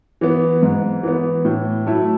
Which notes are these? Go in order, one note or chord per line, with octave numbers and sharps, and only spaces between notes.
E3 B3
G#2
E3 B3
A2
F#3 A3 E4